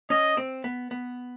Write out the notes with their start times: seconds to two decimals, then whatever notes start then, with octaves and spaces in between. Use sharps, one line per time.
0.10 C#4 D#5
0.37 C4
0.64 B3
0.91 B3